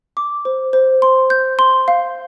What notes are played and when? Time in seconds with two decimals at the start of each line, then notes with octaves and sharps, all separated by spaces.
0.17 D6
0.45 C5
0.73 C5
1.02 C6
1.30 G6
1.59 C6
1.88 F5